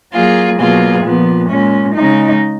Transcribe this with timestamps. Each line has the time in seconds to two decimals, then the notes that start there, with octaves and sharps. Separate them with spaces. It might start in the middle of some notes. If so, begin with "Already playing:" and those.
0.13 F#3 A#3 F4 G#4
0.58 B2 F#3 A#3 F4 G#4
1.04 A#2 F3 B3
1.48 A#2 G#3 C#4
1.94 C#3 G#3 D#4